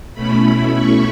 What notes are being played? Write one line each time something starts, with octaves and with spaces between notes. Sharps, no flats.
B2 A3 C#4 E4 B5
C#6